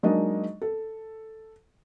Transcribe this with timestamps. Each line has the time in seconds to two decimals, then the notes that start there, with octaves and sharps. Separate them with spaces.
0.03 F#3 G#3 A#3 D4 D#4 D#5
0.62 A4